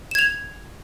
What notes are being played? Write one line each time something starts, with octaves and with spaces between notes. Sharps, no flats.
G#6 E7 F7